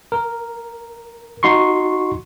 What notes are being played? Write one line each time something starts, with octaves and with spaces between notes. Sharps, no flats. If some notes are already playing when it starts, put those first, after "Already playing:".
A#4
D#4 F#4 C6 C#6